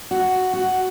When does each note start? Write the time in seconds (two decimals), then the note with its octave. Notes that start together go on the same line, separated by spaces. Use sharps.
0.11 F#4
0.53 F#4